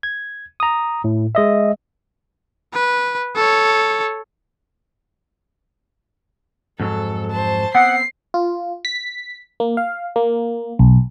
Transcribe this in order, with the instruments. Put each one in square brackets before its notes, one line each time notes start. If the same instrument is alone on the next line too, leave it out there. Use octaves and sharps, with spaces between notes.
[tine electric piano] G#6
A#5 D#6
A2
G#3 D#5 E5
[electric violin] B4
A4 C#5
[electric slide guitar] F2 G#2 F#3 [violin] A4
[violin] C5 A5
[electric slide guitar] B3 C4 [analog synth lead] F#5 [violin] C7
[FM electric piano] F4
B6
A#3
F5
A#3
B1